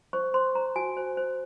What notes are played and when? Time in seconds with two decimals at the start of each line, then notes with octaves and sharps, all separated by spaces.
0.13 C5 C#6
0.34 C5 C6
0.55 C5 A#5
0.76 F#4 G#5
0.97 C5
1.17 C5